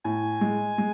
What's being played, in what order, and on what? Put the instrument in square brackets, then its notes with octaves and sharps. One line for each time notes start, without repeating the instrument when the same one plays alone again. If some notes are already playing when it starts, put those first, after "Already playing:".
[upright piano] A2 [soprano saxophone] G#5
[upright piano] G#3
G#3